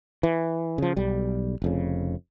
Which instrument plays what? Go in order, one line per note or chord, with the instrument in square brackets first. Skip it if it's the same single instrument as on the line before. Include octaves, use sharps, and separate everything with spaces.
[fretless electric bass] E3
C#3 F3
B1 G3
F1 F2 C#3